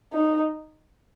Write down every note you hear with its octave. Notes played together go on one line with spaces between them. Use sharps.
D#4